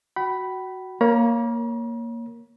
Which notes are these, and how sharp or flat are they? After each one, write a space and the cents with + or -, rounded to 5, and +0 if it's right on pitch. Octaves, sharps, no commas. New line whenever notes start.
F#4 +0 G5 -45 B5 +0
A#3 +0 C#5 +5 A#5 +45